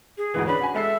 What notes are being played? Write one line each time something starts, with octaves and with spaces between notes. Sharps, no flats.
G#4
D2 G#2 E3
C#4 D4 B4 B5
F#4 G#5
G#3 A4 E5 C7